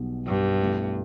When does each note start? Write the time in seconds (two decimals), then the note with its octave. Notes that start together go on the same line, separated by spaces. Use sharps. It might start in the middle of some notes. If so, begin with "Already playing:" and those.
Already playing: B1 B2 G3
0.26 G2
0.60 B2 A3 E4